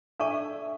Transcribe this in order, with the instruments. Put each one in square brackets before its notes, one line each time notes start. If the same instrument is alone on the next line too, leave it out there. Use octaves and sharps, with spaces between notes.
[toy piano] D4 A4 D5 A5 C#6 [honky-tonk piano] E5